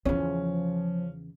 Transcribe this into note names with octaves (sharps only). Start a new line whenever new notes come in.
E2 C#3 F3 C#4